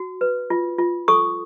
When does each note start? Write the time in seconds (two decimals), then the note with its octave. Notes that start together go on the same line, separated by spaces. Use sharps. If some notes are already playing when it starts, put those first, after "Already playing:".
Already playing: F#4
0.21 B4
0.50 F4
0.79 F4
1.08 A4 C#6 D#6